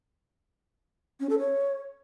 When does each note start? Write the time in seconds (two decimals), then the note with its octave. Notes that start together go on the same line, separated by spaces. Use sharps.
1.20 C#4
1.29 A4
1.39 C#5